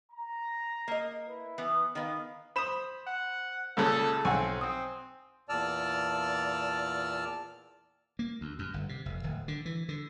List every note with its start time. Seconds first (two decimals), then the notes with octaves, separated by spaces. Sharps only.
0.12 A#5
0.88 A#3 D#5
1.27 E4 B4
1.58 E3 B3
1.95 D#3 B3 F5
2.56 C5 B5 D#6 E7
3.07 F#5
3.77 C#2 A#2 C#3 A4
4.25 B1 C4 F#5 G#5 C#6
4.61 C4 D#6
5.49 E2 A#2 D5 A5 E6 F6
8.19 A#3
8.41 D2
8.59 F#2
8.74 G1
8.89 C3
9.06 F1
9.23 D1
9.48 D3
9.65 E3
9.89 D3